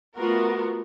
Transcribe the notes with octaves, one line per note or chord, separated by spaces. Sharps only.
A3 B3 F4 F#4 A#4